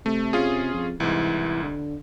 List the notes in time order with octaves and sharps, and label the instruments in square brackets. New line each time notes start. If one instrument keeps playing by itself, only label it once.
[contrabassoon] C3 [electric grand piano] A3
[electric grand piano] C#4 F4 G#4
[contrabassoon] F2
[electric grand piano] C2 G#2 [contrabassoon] E3
[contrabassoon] D3